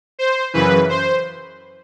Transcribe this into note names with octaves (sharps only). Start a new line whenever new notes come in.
C5
F#2 C#3 E3 B4
C5